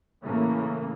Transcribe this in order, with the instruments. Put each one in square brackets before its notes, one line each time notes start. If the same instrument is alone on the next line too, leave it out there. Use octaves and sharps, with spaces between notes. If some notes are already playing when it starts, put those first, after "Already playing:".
[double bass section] A2 C#3 E3 A3 A#3